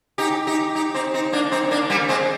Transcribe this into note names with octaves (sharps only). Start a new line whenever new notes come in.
D#4 G4
D#4 G4
D#4 G4
C4 D#4
C4 D#4
A#3 D4
C4 D#4
A#3 D4
G3 A#3
G#3 C4